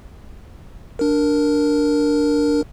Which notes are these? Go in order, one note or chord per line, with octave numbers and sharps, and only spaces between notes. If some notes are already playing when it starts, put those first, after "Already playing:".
D4 A#4